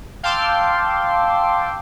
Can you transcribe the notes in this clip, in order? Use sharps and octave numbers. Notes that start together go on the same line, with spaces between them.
F5 G5 A5 C6 D6 E6